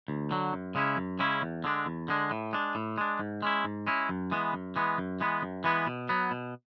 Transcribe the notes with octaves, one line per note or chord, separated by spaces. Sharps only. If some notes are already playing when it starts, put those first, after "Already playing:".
D2
D3 F#3
F#2
C#3 G#3 C#4 E4
F#2
C#3 G#3 C#4 E4
E2
D3 G#3 D4
E2
D3 G#3 D4
A2
G#3 D4
A2
G#3 D4
G#2
G#3 C#4 E4
G#2
G#3 C#4 E4
F#2
E3 G#3 B3
F#2
E3 G#3 B3
F#2
E3 G#3 B3
F#2
E3 G#3 B3
B2
F#3 B3
B2